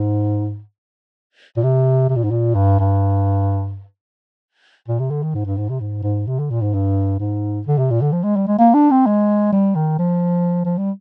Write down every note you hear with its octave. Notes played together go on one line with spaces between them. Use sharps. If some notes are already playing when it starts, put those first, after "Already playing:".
Already playing: G#2
A#2
C3
C3
A#2
G#2
A#2
G2
G2
A#2
C3
D3
D#3
G#2
G2
G#2
C3
G#2
G#2
C3
D3
A#2
G#2
G2
G#2
D3
C3
A#2
D3
F3
G#3
G3
G#3
A#3
D4
C4
G#3
G3
D#3
F3
F3
G3